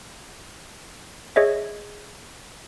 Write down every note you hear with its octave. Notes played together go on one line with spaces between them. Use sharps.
G#4 C#5 D#5 E5